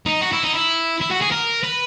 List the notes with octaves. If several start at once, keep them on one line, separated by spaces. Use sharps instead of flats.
D#4
F#4
E4
D#4
E4
E4
F#4
G#4
A#4
B4